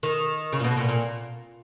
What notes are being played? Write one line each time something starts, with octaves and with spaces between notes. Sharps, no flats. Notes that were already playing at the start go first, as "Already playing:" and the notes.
D#3
C#3
A#2
B2
A#2
A#2